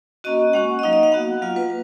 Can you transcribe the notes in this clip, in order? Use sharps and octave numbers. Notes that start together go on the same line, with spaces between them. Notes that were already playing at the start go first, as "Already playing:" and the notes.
A#3 C#4 F#4 D#5
G#3 C#4 F#4 F#5
D#5
F#3 A#3 D#4 F5
D#5
F5
B3 F#4 F#5
F#3 A#3 F4 F5
B4